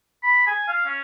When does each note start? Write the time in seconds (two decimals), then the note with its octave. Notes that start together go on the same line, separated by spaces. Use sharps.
0.23 B5
0.47 G#5
0.68 F5
0.86 C#4